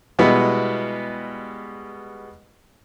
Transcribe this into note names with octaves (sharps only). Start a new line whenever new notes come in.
B2 G3 G#3 B3 E4